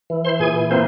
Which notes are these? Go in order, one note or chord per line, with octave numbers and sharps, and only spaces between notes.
E3
C5 C6
A#2 G#4 G#5
A#3 C4 C5